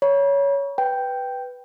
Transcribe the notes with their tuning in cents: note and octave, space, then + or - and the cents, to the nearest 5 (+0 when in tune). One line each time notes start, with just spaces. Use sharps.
C#5 +15 B5 -45
B4 +0 G5 +0